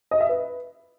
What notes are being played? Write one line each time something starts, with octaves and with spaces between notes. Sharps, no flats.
D#5
E5
B4